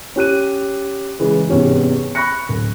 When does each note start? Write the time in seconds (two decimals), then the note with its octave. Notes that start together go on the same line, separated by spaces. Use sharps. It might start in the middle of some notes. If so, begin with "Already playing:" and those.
0.16 C#4 G4 F#6 D#7
1.20 C#3 E3 G#3
1.49 G#1 E2 C3 C#4 G4
2.15 B5 C#6 F#6 A#6 C#7
2.49 D1